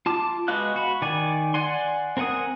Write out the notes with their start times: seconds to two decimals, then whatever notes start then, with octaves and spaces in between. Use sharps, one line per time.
0.06 F4 A5 D6
0.48 G#3 B3 F#4 F5 F#6
0.76 F#4 B5
1.02 D#3 D5 G#5
1.54 D5 F#5 G#5 C6
2.17 C4 A#4 F#5 G#5 D#6